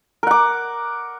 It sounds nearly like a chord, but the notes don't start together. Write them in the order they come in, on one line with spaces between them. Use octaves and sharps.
A#4 F#5 D6